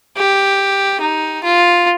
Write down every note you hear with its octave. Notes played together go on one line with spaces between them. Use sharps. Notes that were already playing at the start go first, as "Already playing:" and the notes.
G4
D#4
F4